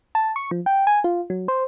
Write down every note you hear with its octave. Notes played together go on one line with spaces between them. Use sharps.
A5
C#6
F3
G5
G#5
F4
F#3
C5